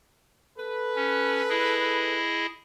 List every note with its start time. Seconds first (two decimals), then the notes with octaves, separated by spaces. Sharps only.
0.59 A4 B4
0.96 C#4
1.49 E4 G#4 D#5